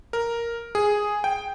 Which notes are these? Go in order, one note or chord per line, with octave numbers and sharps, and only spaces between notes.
A#4
G#4
G5